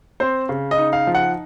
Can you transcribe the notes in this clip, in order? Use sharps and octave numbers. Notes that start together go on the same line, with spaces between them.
C4 C5
C#3
D#5
D#4
F5
F3
F#5